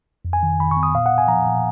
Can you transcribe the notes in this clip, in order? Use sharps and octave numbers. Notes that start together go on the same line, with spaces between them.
F2
G#5
D#3
D#3 B5
C#6
B3
D#6
A#2 F5
F#5
A#2
G#5
F3 A#5
A#2